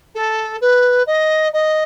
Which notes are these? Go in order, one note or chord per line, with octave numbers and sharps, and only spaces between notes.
A4
B4
D#5
D#5